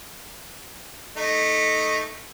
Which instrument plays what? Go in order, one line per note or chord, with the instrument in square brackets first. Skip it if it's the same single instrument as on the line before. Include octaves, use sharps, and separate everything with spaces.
[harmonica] A3 D#4